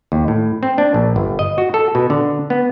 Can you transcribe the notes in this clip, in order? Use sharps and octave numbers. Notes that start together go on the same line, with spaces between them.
D#2
A2
C4
D4
A#1
G1
D#5
F#4
A4
B2
D3
B3